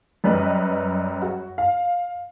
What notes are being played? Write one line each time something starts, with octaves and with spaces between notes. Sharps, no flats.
F#2 G3 B4 D#5
F#4
F5